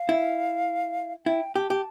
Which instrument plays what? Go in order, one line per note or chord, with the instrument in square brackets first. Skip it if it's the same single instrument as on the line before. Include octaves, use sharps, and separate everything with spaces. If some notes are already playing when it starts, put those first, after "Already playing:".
Already playing: [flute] F5
[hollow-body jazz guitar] E4
[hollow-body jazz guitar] E4 [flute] G5
[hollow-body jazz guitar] G4 [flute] A5
[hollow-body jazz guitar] G4